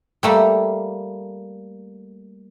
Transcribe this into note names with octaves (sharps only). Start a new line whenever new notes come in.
G3 A3 A#3